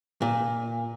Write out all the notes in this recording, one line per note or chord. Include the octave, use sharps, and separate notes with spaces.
A#2